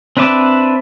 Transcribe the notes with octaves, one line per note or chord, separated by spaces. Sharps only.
C4 D4 B4 E5 D6